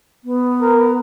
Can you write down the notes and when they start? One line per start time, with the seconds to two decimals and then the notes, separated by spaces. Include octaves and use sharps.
0.24 B3
0.61 A#4